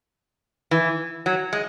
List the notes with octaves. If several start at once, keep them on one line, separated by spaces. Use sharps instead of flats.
E3
F#3
G#3